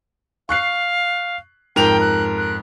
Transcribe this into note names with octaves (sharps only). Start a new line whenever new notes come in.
F5 C#6 F#6 C7
F2 G#2 A#4 G5 F7
F#6
F#6